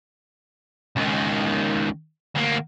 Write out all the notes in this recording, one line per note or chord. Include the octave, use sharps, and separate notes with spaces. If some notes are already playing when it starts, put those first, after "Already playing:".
C#2 D#3
D2 A#3